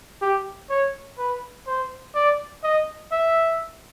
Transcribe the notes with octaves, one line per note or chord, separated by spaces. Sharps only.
G4
C#5
B4
C5
D5
D#5
E5